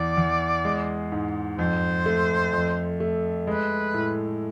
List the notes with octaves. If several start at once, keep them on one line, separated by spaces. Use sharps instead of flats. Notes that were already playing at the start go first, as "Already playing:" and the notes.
Already playing: E2 D5
E2
G#3
G#2
F2 C5
A3
F2
A3
G#3 B4
A2